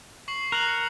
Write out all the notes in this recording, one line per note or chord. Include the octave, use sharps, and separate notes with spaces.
C#6 C7 F#7
A#4 F#6 F#7
C#7